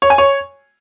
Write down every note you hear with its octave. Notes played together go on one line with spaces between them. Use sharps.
C#5
G#5
C#5